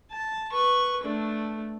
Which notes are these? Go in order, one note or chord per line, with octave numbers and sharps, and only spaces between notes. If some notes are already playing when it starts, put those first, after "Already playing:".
A5
B4 C#6
A3 D4